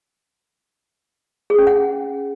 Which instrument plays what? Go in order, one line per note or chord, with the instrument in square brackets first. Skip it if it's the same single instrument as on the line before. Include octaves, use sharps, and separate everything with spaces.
[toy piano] G#4
C#4
F#5